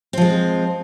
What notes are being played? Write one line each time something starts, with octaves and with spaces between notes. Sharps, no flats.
F3 G#3 C4